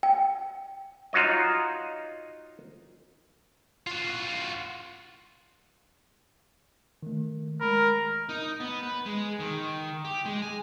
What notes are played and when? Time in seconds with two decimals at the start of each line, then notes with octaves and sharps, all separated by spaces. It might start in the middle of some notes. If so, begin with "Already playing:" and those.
0.03 G5
1.13 D#4 F4 F#4 C#5 D#5
3.87 F4 F#4
7.03 D#3 A3
7.61 G#3 A#4 B5
8.29 D#4
8.60 B3
8.83 B4
9.06 G#3
9.40 D#3
10.05 G4
10.25 G#3
10.42 G#5